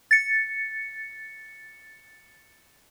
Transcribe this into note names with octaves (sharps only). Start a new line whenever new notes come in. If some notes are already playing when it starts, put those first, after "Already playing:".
A6 C#7